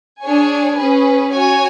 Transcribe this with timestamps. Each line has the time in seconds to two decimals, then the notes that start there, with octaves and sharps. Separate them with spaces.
0.23 D4 G#4 C#5 G#5
0.78 C#4 G#4 B4
1.33 F#4 C#5 G#5